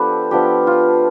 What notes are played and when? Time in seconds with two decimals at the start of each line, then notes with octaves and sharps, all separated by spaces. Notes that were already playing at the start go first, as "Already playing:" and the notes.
Already playing: F3 B3 D4 F4 G4 A4 B4
0.31 F3 B3 D4 F4 G4
0.67 F4